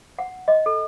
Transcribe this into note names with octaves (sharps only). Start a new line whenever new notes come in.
F#5
D#5
A4